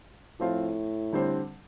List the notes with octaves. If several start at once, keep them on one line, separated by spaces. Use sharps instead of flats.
A2 F3 C4 F4
D3 G3 C4